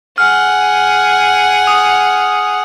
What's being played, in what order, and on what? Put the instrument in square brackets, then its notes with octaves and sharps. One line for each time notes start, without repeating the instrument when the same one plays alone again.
[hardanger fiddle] G#4 F#5 [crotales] F6
[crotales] D#6